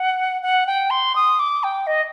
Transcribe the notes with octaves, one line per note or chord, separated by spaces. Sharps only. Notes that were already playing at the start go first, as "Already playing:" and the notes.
Already playing: F#5
F#5
G5
C6
D#6
D6
G5
D#5